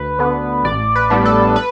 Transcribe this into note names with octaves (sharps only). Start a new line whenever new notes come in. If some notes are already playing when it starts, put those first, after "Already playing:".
Already playing: D2 B4
D3 B3
A1 D5
B4
A2 G3 B3 D4
A4
B4